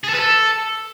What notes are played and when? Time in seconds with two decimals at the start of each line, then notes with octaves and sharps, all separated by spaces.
0.04 G#4
0.09 A4
0.14 B4
0.19 A4